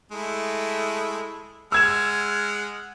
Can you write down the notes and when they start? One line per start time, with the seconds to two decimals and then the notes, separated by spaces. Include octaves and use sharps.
0.12 G#3 A3 E4
1.72 G#3 F#5 E6 F6 G#6 E7